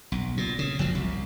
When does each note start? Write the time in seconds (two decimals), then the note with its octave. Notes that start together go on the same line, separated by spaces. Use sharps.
0.12 B1
0.37 A#2
0.59 C#3
0.79 F#1 F3 F#3
0.95 C2